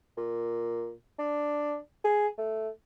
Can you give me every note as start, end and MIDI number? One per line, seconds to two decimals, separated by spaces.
0.17 0.92 46
1.19 1.76 62
2.05 2.27 68
2.38 2.69 57